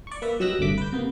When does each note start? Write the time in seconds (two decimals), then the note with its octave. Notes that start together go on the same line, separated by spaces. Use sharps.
0.07 D5 C#6
0.22 A#3 B4 E5
0.40 F#3 G4 D#5 E6 F#6 A#6
0.59 G1 G2 C3 A3 D6 B6
0.78 B4 G6
0.92 C3 A#3 B3